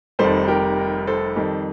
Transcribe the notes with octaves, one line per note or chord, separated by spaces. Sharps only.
F1 F2 D#3 G3 A4 C5
G4 A#4
A4 C5
F2 D#3 G3